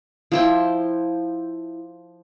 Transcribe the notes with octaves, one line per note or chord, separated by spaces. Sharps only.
F3 E4 G5